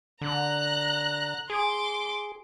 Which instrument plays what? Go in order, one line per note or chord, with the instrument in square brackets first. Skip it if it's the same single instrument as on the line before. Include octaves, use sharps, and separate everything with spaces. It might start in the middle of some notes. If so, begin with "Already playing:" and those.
[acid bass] D3 [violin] A#5 F#6
[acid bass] G#4 [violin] C6 D6